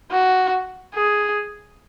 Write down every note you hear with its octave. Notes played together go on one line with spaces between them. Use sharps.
F#4
G#4